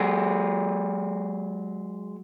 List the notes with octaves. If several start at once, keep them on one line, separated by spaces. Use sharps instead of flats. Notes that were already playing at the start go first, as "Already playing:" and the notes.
Already playing: F#3 G#3